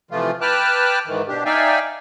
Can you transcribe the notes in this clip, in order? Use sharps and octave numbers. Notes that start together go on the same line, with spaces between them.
C3 E3 F3 A3 F4
B4 G5 A5 D6 F6 F#6
G#2 D#3 E3
B2 D4 G4
D#4 D5 E5 F5 G5 G#5